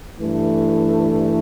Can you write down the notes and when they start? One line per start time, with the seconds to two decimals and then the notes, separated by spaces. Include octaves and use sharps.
0.20 G2 E3 A3